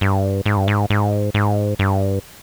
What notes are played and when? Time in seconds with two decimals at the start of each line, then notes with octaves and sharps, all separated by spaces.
0.01 G2
0.46 G#2
0.57 G2
0.68 G#2
0.90 G#2
1.34 G#2
1.79 G2